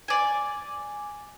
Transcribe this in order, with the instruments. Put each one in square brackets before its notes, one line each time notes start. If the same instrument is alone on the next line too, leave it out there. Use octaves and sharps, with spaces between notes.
[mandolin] D5 G#5